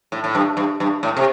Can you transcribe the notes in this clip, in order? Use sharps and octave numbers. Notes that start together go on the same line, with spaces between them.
A2
A2
G2
G2
G2
A2
C3